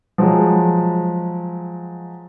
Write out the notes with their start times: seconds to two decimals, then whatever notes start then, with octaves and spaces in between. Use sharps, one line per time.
0.18 F3 F#3 G#3